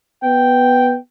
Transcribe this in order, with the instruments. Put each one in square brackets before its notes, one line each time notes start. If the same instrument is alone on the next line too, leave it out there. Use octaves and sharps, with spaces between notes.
[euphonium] B3 [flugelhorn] G5